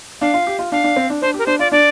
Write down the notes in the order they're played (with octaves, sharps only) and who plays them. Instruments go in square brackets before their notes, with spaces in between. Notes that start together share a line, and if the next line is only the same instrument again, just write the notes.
[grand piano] D4 [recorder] F5
[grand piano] F4
G4
F4
[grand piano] D4 [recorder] F5
[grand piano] D4
C4
D4
[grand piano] D4 [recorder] C5
[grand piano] G4
[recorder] A#4
[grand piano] D4 [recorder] C5
[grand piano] F4 [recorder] D5
[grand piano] D4 [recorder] D5